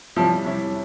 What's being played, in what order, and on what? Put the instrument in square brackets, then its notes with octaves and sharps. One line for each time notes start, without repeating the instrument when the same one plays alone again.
[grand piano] C3 G3 C#4 E4 [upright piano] F3
[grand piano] C3 G3 C#4 E4